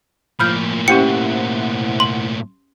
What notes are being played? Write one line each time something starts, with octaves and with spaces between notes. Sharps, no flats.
A2 F3 A#3 B5 F6 G6
C#4 E4 G4 C5 F#5 G5 C#7
C6